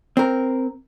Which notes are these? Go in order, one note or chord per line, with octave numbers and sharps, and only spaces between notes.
C4 A#4